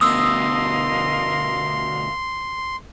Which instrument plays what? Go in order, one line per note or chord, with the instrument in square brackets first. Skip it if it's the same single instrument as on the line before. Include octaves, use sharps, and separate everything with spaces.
[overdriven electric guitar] D2 B2 [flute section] A#4 D#5 F5 [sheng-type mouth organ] C6 [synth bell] D#6 E6